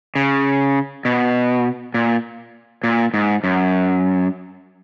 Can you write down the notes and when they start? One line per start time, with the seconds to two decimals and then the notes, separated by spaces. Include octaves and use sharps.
0.15 C#3
1.05 B2
1.94 A#2
2.84 A#2
3.14 G#2
3.44 F#2